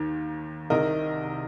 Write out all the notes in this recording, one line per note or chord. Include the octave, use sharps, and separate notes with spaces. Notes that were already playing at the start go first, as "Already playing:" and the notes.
Already playing: D#2 D#3
C2 C3 D#3 A#4 D#5